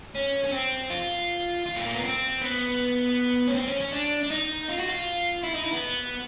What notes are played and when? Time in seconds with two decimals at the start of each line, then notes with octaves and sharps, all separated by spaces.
0.15 C#4
0.44 C#4
0.52 C4
0.90 F4
1.66 F4
1.75 A3
1.85 A#3
1.94 B3
2.04 C4
2.41 B3
3.48 C#4
3.54 C4
3.68 C#4
3.81 C#4
3.93 D4
4.23 D4
4.31 D#4
4.68 F4
4.79 F#4
4.89 F4
5.43 E4
5.54 D#4
5.63 E4
5.72 B3